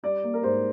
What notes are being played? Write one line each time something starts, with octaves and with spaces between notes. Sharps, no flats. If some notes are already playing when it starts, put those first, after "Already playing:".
G3 D5
A#3
A#4
G#2 C5